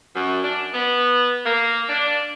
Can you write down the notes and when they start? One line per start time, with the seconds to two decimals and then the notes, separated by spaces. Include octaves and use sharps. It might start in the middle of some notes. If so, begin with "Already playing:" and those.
0.14 F#2
0.44 D4
0.73 B3
1.44 A#3
1.88 D4